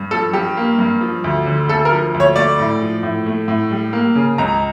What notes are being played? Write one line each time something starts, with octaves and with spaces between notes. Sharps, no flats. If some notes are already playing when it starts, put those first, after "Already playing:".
Already playing: G2
F3 A4
G2 G4
A#3
G2
F3
D2
D3
D2 A4
A#4
F3
D2
C#5
A3 D5
A2
F3
A2
A3
A2
G3
A#3
C#3
C#2 A#5